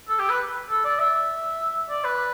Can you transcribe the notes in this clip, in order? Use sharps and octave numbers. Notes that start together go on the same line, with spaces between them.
A4
G4
B4
A4
D5
E5
D5
B4